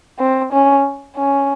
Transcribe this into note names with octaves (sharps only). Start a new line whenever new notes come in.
C4
C#4
C#4